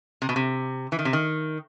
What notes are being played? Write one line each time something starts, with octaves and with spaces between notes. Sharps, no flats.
C3
B2
C3
E3
D#3
C3
D#3